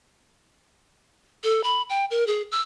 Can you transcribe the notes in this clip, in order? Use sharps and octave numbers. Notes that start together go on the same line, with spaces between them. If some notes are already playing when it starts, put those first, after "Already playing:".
A4
B5
G5
A#4
G#4
E6